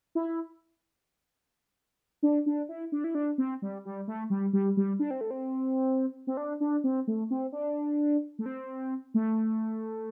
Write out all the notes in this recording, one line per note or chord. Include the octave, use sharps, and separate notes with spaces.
E4
D4
D4
E4
D4
E4
D4
C4
G3
G3
A3
G3
G3
G3
D4
C4
A3
C4
C4
D4
D4
C4
A3
C4
D4
A3
C4
A3